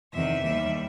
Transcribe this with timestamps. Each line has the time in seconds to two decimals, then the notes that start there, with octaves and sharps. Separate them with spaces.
0.12 E2 C3 D#3 E5
0.42 D#2 D#3 G3 E5